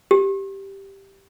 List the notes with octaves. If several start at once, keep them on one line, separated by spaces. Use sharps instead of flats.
G4